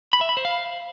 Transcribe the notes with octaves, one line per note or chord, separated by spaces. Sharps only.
B5
E5
B5
C5
F5